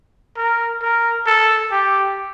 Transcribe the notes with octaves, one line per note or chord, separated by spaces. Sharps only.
A#4
A#4
A4
G4